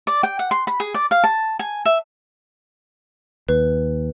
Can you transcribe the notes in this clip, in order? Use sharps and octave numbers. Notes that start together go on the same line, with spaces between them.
D5
G5
F#5
C6
B5
G#4
D5
F5
A5
G#5
E5
D#2 B4